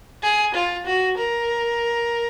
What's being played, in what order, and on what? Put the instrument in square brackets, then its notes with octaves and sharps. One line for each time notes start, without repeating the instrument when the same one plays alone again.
[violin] G#4
F4
F#4
A#4